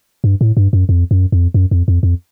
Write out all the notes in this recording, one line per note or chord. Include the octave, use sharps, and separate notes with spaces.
G2
A2
G2
F#2
F2
F#2
F2
F#2
F2
F2
F2